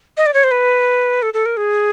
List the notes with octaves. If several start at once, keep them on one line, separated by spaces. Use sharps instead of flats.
D#5
D5
C#5
C5
B4
A4
A4
A#4
G#4